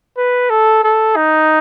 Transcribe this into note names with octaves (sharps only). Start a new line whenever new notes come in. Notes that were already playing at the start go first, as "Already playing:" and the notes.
B4
A4
A4
D#4